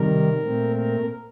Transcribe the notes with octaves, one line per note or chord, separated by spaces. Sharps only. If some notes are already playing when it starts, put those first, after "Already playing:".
Already playing: C3 D#3 G3 A#4
A#2 A3 C4
A#4